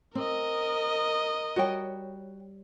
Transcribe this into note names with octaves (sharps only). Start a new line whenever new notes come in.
C4 A#4 D#5
G3 F#4 C#5 G5